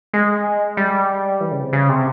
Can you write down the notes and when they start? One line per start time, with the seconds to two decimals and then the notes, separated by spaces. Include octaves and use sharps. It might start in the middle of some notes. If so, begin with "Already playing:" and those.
0.14 G#3
0.77 G3
1.41 E3
1.51 C#3
1.62 C3
1.73 C#3
1.89 C3